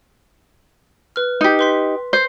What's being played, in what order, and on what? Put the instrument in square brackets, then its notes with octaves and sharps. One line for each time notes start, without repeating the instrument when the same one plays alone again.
[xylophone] B4 F6
[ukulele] D#4 G4
[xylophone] B4 C6 B6
[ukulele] C5